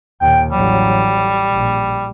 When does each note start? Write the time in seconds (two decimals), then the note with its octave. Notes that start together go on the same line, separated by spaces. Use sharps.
0.21 D#2 A#2 G5
0.51 A1 F#3 G3
1.51 A#1